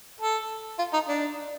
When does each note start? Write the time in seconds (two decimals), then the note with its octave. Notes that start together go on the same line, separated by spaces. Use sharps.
0.21 A4
0.79 F4
0.93 D#4
1.08 D4